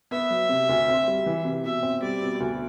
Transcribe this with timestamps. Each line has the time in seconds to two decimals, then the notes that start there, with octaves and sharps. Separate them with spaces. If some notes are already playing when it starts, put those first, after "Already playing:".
0.11 B3 E5
0.30 F#3
0.49 C3
0.69 D2
0.89 C4
1.08 G3
1.26 E3
1.45 C3
1.65 B2 E5
1.83 C4
2.02 G3 D5
2.22 B2
2.40 D2